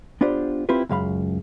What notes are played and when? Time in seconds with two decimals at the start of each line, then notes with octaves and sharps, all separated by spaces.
0.21 B3 D4 F4 G4 C5
0.69 C4 E4 F4 G4 B4
0.89 C#2 F#2 F5 B5